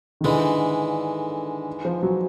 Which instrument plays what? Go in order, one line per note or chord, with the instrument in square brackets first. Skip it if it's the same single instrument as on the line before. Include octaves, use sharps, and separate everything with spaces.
[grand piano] D#3
[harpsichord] G#2 E3 G#3 [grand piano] D3
[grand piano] F3
F#3